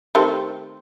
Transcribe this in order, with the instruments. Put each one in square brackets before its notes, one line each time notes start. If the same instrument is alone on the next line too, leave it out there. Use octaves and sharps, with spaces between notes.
[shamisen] D#3 A3 C4 [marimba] G4